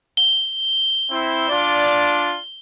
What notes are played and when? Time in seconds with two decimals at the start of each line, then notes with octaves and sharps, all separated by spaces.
0.17 G7
1.10 C4 E4
1.49 D4 F4 D5